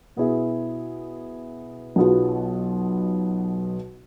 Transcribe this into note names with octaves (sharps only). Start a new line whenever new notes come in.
B2 B3 E4 G#4
B1 B2 B3 F4 G#4